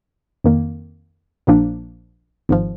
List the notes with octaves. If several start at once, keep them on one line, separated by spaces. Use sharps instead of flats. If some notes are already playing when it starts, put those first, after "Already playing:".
F2 D#3 A#3
A#1 A#2 F3 A#3 D4
G#1 G#2 F3